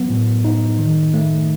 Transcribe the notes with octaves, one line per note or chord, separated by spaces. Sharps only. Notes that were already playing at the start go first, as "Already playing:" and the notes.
Already playing: F#3 B3
A2
D#4
D#3
A3